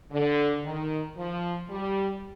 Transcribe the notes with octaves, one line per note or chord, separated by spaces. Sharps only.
D3
D#3
F3
G3